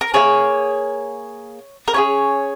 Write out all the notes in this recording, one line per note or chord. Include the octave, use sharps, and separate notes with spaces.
A#4
A#3 F4 G#4 C#5
A#4
C#4 F4 G#4 C#5